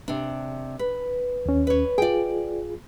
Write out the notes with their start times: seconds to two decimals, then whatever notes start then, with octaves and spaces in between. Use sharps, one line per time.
0.08 C3 D4
0.79 B4
1.46 D#2 C#4
1.67 B4 C#5
1.98 F4 G#4 D5 G5